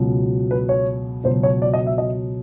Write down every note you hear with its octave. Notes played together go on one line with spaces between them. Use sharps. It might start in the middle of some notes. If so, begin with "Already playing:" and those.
Already playing: C#2 B2 F#3
B4
C#5
C#2 B2 F#3 C5
C#5
D5
D#5
E5
D#5